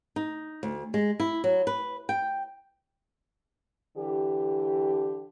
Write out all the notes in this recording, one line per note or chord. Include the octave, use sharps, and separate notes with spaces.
D#4
D2
G#3
E4
F#3
B4
G5
D3 E3 G4